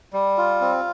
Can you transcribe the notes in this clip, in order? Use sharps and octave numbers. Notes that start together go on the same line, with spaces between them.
G3
F4
C4